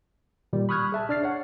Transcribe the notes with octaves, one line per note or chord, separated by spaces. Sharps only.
A#2 D#3 G3
B5 C#6 D#6 F6 F#6 G#6
G#4 E5 A5
D4 D5 F6 A6 C7
C#5 F#5